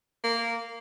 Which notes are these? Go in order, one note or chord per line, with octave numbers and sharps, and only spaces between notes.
A#3